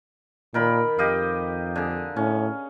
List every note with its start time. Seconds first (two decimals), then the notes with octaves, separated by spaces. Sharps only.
0.54 A#2 D#3 A#4 B5
0.99 F2 G4 D#5 F5
1.76 D3 G#4
2.16 A2 C#4